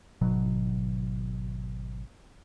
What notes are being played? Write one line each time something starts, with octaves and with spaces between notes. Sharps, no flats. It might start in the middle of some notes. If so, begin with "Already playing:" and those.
G#1 B2 F#3